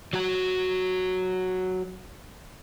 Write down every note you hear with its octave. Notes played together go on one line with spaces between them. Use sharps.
F#3 F#4 A#5